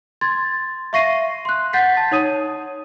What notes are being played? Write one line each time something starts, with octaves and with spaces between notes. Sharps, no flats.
C6 G#6 A6
E5 F5 C#6 A#6 C7 D#7
C6 F#6
F#5 G6 A6 B6 C7
A5
D#4 C#5 D#6 D#7